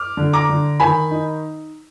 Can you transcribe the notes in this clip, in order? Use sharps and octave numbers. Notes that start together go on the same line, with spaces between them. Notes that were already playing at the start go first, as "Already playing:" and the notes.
Already playing: D6 F6
D3
A#5 D6
D3
D#3 G#5 B5
D#4